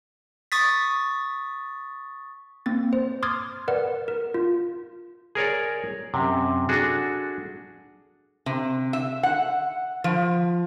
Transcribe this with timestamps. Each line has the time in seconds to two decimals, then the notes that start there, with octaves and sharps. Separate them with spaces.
0.52 C#6 D#6 A6 B6
2.66 A#3 C4 A6
2.93 C5
3.23 C6 D6 D#6 F6 G#6 A6
3.68 A#4 B4 D5 F#5
4.08 A#4
4.34 F4
5.35 G#4 A#4 C#5 D5
6.14 F#2 C3
6.69 D4 F#4 G#4 A4
8.46 C3
8.93 E5
9.23 F#5
10.04 F3